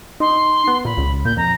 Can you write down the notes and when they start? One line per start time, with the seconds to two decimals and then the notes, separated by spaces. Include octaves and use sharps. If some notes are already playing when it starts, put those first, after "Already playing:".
0.20 D#4 C6
0.68 B3
0.85 A#2 B5
0.97 C#2
1.25 A#2 G6
1.37 F2 A#5